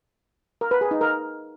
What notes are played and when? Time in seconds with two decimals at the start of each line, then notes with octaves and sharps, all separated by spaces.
0.61 A#4
0.71 B4
0.81 G#4
0.91 D#4
1.01 A#4